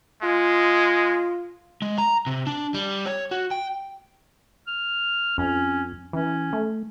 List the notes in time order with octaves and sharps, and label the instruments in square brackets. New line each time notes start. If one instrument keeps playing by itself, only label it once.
[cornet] G#3 [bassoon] F4
[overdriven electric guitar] G#3
A#5
C3
D4
G3
C#5
F#4
G5
[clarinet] F6
[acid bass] F2 [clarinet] C#4
[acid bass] E3 [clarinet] C#4
[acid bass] A3